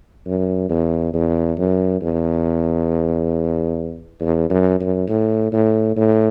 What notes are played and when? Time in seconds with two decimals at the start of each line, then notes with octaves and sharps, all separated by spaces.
0.26 F#2
0.70 E2
1.13 E2
1.58 F#2
2.01 E2
4.21 E2
4.50 F#2
4.80 F#2
5.08 A2
5.52 A2
5.96 A2